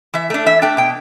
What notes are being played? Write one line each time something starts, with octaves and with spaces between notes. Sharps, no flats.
E3 E5
A3 D4
E3 E5
A3 D4 G5
B2 G5